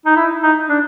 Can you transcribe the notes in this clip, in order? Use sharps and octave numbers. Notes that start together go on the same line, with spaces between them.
D#4
E4
D#4
D4